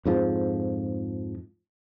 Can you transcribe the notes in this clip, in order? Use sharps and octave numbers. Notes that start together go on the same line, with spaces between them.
F2 G#2 F3